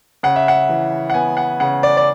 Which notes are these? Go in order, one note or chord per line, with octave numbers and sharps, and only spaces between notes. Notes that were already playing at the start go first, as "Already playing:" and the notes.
C#3 F#5
E5
F#5
E3
F#5
B3 G#5
F#5
C#3 F#5
D5
D5